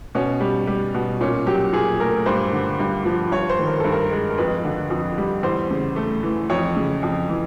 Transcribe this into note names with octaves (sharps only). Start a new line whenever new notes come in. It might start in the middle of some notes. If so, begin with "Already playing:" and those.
B2 C#4
G3
G3
B2
A#2 C#4
F#3 G4
A#2 G#4
A3 A#4
G2 C5
D3
G2
F3
G2 C#5
C5
D#3
A#4
G2 A4
A#4
G#3
A#4
F2 B4
D3
F2
G3
E2 C5
C#3
A3
E3
F2 C#5
C#3
F2
E3